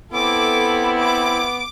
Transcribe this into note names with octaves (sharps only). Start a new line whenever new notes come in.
B3 C4 E4 A4 D6
D6